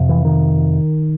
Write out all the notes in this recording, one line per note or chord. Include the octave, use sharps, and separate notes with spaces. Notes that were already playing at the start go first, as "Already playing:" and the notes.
Already playing: F2 C3
E3
D#3